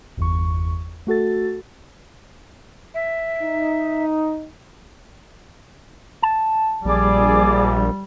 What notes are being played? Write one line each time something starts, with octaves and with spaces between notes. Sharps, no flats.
G1 E2 C#6
A3 F#4 A4 A6
E5
D#4
A5
A#1 G3 G#4 D5 D6